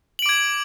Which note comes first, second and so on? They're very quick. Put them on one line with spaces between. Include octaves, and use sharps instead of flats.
F#7 D7 D6 G#6